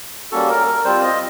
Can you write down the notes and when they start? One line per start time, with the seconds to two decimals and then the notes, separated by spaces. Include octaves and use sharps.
0.32 G3 A#3 C#4 F#4 A4
0.49 A#4
0.67 A#4
0.84 G3 C4 F4 C5
1.03 D#5